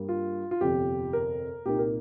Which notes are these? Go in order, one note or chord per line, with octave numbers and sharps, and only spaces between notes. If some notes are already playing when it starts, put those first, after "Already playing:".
Already playing: G2 G3 A#3
F4
F4
G1 F2 C3 G4
A#4
C2 A#2 A#3 D#4 G4
A#4